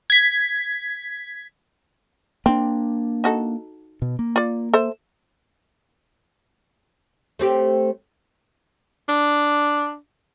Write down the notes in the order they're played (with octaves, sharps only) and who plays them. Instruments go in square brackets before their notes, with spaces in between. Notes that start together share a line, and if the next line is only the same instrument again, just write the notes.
[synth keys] G#6 B6
[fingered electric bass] A#3 D4 [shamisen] C4
[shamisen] D#4 F#4 A4
[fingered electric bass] B2
A#3
[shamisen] F4 D5
A4 C5 E5
[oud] A3 C4 G4
[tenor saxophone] D4